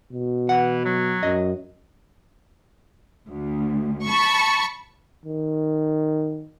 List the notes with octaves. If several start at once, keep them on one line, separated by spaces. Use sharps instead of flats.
B2
E3 F#5
F#3
F#2 D#5
D2
A5 B5 C#6
D#3